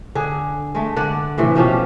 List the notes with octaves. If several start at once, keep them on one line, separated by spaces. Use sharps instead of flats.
D3 G#4
G#3 A3
D3 D5 F#5
A2 C3 E3
B2 F3 C#4 G4